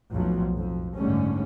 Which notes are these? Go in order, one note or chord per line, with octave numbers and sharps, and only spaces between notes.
B1 F2 A2 F3 F#3
F2
F#1 G#2 D3 G3 A3 C#4